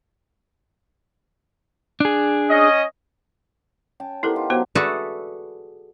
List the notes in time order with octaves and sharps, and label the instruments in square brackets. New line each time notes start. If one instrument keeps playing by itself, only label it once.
[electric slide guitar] D4 G#4
[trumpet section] C#4 D#5
[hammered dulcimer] C#4 G5 A5
[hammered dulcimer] B3 D#4 G4 [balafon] E4 A4 A#4
[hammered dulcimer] F4
[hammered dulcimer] D#3 F#3 [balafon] B3 F#4 C5
[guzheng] F#4 G#4 A4 B4 D5 E5